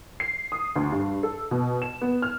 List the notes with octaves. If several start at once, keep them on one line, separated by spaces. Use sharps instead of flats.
C7
D#6
D2
G2
A4
B2
E7
B3
F6